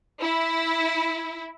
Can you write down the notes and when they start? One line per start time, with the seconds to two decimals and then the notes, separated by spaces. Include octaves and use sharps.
0.21 E4